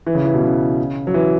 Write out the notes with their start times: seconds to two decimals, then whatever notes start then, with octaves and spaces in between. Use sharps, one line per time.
0.07 E3
0.15 C#3
0.25 E3
0.34 B2
0.43 C#3
1.07 F#3
1.14 E3